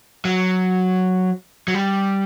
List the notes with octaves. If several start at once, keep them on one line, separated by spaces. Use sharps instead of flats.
F#3
F#3
G3